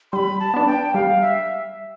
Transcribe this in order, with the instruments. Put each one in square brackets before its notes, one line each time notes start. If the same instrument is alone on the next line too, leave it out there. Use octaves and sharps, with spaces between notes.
[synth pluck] G3 [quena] B5 C6
[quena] A5
[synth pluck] B3 D4
[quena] G5
[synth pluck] G3 [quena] F5
[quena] E5